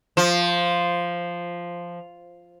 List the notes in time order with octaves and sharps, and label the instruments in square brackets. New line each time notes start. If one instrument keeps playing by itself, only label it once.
[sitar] F3